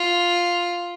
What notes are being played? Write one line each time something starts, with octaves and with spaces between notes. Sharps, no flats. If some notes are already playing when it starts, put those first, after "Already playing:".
Already playing: F4